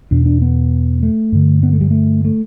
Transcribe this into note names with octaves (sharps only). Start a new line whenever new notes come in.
E2 B2 D4
D4
B3
A3
G2 D3
B3
A3
G3
A3
A3